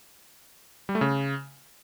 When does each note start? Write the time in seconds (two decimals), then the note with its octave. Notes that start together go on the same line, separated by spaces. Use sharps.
0.89 G3
0.95 A3
1.01 C#3